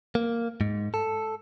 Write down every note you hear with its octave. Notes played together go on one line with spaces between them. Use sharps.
A#3
G#2
A4